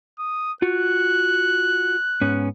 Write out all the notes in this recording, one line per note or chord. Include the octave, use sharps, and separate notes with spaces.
D#6
F4 F#4 F#6
G#2 B3 C#4